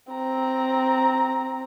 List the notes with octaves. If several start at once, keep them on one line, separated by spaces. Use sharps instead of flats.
C4 A#5